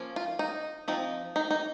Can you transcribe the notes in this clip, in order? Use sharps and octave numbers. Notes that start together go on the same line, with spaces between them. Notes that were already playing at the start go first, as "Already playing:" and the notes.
Already playing: F3 A#3 C#4
F4
D#4
F3 C4 D#4
D#4
D#4